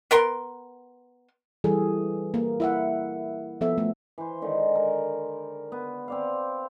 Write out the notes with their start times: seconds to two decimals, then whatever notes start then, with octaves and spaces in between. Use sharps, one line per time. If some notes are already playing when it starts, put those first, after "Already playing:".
0.11 B3 A#4 C6
1.64 E3 G3 G#4 A4
2.34 A#3
2.60 E4 E5 F#5
3.61 F3 B3 A4 E5
3.78 A3
4.18 E3 C5
4.42 D3 D#3 G#3
4.75 A#4
5.72 B3
6.08 C4 D5 F5